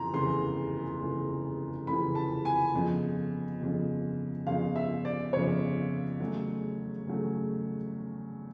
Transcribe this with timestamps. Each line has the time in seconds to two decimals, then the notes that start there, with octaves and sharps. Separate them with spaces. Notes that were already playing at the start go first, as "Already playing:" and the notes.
Already playing: F1 E2 C#3 E3 A#5 C6
0.13 F1 E2 C#3 E3 C6
1.00 F1 E2 C#3 E3
1.87 F1 E2 C#3 E3 B5
2.15 A5
2.45 G#5
2.73 G1 F2 C#3
3.60 G1 F2 C#3
4.47 G1 F2 C#3 F5
4.76 E5
5.05 D5
5.33 G1 F2 C#3 C#5
6.20 E2 C#3 F#3 A3
7.07 E2 C#3 F#3 A3